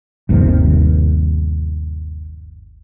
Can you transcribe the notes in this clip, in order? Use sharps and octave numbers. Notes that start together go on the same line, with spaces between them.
G1 D#2 C3 D#3